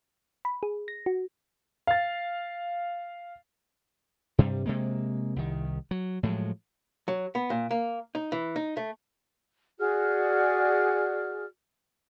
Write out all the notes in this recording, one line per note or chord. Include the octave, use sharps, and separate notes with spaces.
B5
G#4
A#6
F#4
F5 A6
G2 C3 G3
C3 G#3 A#3
C2 D#3
F#3
A2 F3 F#3 G#3
F#3
B3
A#2
A#3
D#4
E3
D#4
A3
F#4 G#4 D5 F6